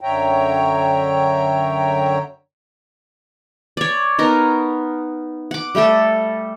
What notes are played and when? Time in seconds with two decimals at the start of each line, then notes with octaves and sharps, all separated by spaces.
0.01 F#2 D3 C#5 E5 G5 A#5
3.77 C#5 D5
4.19 B3 D#4 A#4
5.51 F#5 D6
5.75 G3 A3 G4 A4